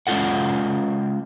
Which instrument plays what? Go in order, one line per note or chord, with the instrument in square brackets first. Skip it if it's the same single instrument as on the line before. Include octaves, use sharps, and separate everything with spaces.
[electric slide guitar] G#3 C#4 D#4 F4 A4 F#5